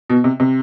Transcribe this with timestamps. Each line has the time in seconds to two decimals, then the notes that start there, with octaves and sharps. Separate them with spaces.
0.10 B2
0.24 C3
0.40 C3